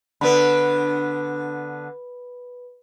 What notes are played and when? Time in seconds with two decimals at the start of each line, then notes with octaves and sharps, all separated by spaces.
0.21 D3 B3 B4 B5